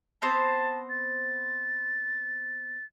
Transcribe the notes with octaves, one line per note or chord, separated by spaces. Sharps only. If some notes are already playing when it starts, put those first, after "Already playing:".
B3 C4 C5 A5
A6